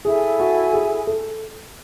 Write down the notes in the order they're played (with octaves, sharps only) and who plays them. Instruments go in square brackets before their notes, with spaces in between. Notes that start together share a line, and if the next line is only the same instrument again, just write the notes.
[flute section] E4 A4 E5 G#5 [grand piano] G#4
[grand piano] F#4
G#4
A4